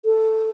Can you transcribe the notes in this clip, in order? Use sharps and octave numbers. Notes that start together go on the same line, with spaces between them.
A4